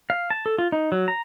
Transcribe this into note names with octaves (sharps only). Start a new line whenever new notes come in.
F5
A5
A4
F4
D#4
F#3
A#5